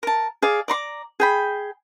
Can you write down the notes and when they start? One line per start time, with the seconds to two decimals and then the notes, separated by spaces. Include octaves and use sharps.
0.03 A#4 A5
0.42 G#4 D5 F5
0.68 D5 A#5 C6 D6
1.20 G#4 G5 B5